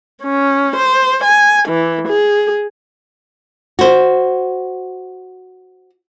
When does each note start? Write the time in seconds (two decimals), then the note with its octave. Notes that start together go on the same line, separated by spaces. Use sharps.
0.23 C#4
0.75 C5
1.24 G#5
1.68 E3
2.08 G#4
3.79 F#4 C5